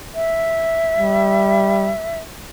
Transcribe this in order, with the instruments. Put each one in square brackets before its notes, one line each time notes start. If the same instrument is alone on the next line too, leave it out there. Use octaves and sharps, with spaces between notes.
[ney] E5
[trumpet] G3